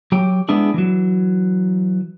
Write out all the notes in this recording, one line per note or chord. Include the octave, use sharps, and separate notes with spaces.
F#3 G4 G5
G#3 B3 D4 E4 G#4
E3 F#3